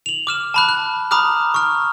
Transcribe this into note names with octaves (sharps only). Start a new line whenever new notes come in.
F7 F#7
D6 F6 E7
A5 B5 F#6
F#6
A#5 B5 D6 D#6 F6 F#6
C#6 F6